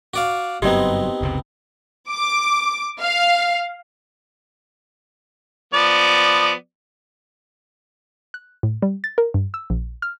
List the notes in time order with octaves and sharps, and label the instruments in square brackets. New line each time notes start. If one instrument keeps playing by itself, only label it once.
[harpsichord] F#4 D5 F5
[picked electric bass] F#1 G2 F#3 [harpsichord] B3 C4 D#4 [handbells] G4 D#5
[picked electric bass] F#1 C#2 C3
[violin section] D6
F5
[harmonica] F3 B3 D5
[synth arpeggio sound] F#6
A2
G3
A6
A#4
G2
E6
A#1
F6